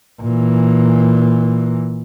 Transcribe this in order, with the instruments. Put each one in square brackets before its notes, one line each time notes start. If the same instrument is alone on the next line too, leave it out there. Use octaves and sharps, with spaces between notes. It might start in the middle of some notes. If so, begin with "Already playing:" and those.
[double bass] A#2 E3